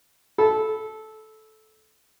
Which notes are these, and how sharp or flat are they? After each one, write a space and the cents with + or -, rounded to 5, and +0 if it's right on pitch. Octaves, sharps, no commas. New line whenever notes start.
A4 -15 B5 +0